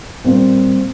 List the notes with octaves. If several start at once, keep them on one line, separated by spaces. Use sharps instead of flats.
A#2 G3 A#3 C4